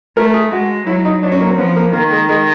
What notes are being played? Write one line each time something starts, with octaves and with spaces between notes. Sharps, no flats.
A3 A#4
G#4
G#3 F#4
F#3 E4
D#4
F#3 D4
C#4
A#3
C4
F3 B3
A#3
D#3 A#3
G#3
G#3